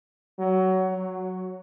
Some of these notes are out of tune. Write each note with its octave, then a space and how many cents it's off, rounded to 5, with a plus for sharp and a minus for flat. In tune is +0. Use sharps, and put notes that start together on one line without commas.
F#3 +20
F#3 -5